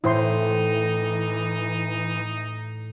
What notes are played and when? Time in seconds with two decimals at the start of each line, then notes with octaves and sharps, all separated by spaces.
0.04 A2 E3 D#4 E4 C5 C6